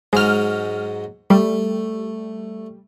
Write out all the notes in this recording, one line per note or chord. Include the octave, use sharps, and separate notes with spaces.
G#2 F#3 G#3 D#4 F6
G3 A3